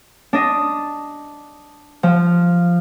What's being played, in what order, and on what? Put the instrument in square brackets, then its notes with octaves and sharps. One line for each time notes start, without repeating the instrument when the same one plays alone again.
[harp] D4 D#5
F3